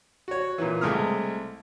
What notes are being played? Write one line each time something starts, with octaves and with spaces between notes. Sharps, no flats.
F#4 C#5
A#2 E3
C2 G#3 A3 D#6 F6